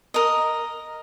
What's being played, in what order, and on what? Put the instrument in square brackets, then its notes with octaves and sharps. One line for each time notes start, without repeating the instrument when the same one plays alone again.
[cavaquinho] A#4 D#5